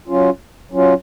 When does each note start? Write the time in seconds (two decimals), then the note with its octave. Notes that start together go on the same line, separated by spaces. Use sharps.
0.08 F#3 C#4 F4
0.71 F#3 C#4 F4